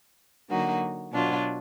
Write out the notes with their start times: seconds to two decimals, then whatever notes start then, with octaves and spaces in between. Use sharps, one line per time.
0.50 D3 F#3 A#3 D#4 F#4
1.13 B2 F#3 D4 F4